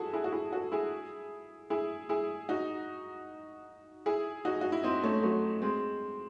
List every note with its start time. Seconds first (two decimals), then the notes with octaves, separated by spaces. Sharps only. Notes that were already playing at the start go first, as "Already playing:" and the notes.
Already playing: E4 F#4 G#4 A4
0.13 E4 G#4
0.24 F#4
0.32 E4 G#4
0.52 F#4 A4
0.72 E4 G#4
1.70 E4 G#4
2.09 E4 G#4
2.49 D#4 F#4
4.06 E4 G#4
4.45 D#4 F#4
4.61 F#4
4.72 E4
4.83 C4 D#4
5.03 A3 C#4
5.23 F#3 A3
5.62 G#3 C4